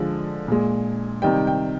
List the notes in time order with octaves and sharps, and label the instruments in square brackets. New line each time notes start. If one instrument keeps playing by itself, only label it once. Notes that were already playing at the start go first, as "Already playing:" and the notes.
Already playing: [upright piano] D3 F3 G#3
A#2 G#3
C3 D#3 G3 G5
G5